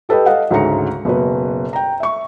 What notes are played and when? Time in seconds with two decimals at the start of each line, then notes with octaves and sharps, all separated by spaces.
0.09 G4 A4 B4 D#5 G5
0.26 A4 D#5 F5 F#5
0.51 D2 G#2 C#3 C#4 A#5 C#7
1.05 F#1 B2 B4
1.73 G5 A#5
2.00 E5 C#6